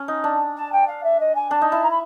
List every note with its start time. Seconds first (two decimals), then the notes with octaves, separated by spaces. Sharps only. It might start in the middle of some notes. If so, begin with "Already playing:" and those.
Already playing: C#4
0.08 D#4
0.24 D4
0.56 A5
0.72 G5
0.87 F5
1.03 E5
1.20 D#5
1.35 G#5
1.50 D4 A5
1.62 D#4
1.67 E4 A5
1.82 A#5
1.90 B5